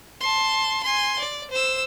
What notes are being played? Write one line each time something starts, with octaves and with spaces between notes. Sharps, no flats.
A5 C6
G#5 C6
D5
C5 E6